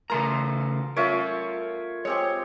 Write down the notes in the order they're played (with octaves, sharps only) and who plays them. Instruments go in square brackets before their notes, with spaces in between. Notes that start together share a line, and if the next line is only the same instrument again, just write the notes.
[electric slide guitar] C#3 A3 A#5 [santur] A#4 A5 C6
[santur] A3 F4 C#5 [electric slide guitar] A#4 E5
[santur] G#3 C4 G4 [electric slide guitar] C#5